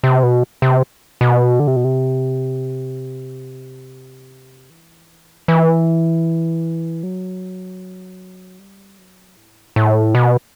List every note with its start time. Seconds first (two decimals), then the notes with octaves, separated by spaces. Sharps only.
0.04 C3
0.23 B2
0.62 C3
1.21 B2
1.60 D3
1.67 C3
1.76 B2
1.84 C3
4.70 E3
5.48 E3
7.03 F#3
8.59 G3
8.98 F#3
9.37 A2
9.76 A2
10.15 B2